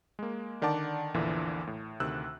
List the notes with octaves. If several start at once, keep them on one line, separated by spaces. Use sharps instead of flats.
G#3 A#3
D3 D#3 D5 F#5 A5 D6
A#1 E2 A#2 D3 E3
A2
D2 C3 D#3 E6 F#6